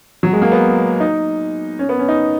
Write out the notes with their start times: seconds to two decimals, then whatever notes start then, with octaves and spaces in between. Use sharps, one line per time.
0.23 F#3
0.33 G#3
0.42 A#3
0.52 B3
1.00 D#4
1.79 C#4
1.89 B3
1.99 C#4
2.08 D#4